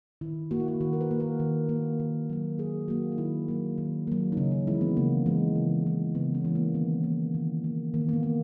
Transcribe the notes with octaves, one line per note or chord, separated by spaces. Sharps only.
D#3 E4
A#3 F#4
E4
F#4
D#3 F#4
A#4
B4
A#3
A#4
D#3
A#3
D#3
F#3 A#3
D#3 G#4
F#3 A#3 F#4
D#4
D#3 E4
F#3 A#3
D#3
F#3 A#3
D#4
C#3 C#4
D#4
E3 G#3 E4
B3
C#3 A#3
E3 G#3
C#3
E3 G#3
C#3 B3
C#4
E3 G#3
A#3
D#3 B3
A#3
D#3
A#3
D#3 A#3
A#3
B3
A#3